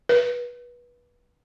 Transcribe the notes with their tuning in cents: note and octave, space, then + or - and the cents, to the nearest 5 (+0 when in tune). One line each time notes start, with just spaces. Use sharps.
B4 -25